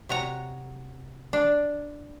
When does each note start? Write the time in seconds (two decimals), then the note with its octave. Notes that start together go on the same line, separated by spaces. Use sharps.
0.09 C3 F#4 C#5 A#5
1.33 D4 D5